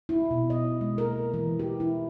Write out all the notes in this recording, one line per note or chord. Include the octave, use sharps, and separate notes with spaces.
E4
B2
D#5
G#3
A#4
E3
G4
E4